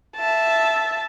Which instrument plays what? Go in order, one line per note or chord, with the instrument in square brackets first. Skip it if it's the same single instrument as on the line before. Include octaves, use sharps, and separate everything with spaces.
[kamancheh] E5 A5